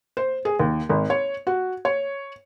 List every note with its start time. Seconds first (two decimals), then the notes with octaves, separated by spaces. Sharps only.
0.17 C5
0.45 G#4
0.60 D#2
0.89 G#1
1.10 C#5
1.47 F#4
1.85 C#5